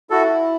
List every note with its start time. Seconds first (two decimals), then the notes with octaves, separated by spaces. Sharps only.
0.10 E4 F#4 A4